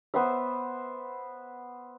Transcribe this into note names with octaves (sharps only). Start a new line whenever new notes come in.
B3 C5 E5